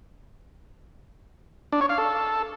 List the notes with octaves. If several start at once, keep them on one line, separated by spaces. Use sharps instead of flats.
D4
C#5
F5
A4